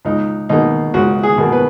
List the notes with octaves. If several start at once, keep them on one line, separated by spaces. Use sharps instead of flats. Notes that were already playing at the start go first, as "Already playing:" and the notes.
C#2 D#4
B2 A#3 D#4
C#2 F#4
G#4
B2 A#3
B4